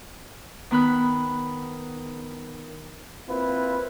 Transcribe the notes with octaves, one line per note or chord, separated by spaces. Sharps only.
D#3 B3 B5 F#6
A#3 C4 E4 F4 B4